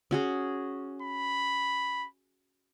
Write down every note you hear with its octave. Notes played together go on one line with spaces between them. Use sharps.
C#4 F#4 G#4
B5